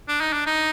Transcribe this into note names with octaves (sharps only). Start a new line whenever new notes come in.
D4
D#4
D4
D#4